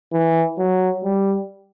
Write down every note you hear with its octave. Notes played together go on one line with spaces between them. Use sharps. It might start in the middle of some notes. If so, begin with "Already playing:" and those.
E3
F#3
G3